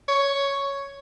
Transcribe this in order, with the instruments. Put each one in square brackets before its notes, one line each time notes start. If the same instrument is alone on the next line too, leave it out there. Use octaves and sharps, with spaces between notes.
[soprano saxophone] C#5